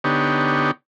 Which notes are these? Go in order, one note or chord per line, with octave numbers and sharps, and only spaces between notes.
D3 B3 D#4 G4 C#5